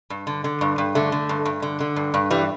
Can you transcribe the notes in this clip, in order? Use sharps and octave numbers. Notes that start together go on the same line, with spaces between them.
G2
D3
D3
G2
G2
D3 A3
D3
G2
G2
D3
D3
G2
G2
E3 G3